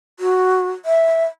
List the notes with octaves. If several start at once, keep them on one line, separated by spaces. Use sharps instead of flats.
F#4
E5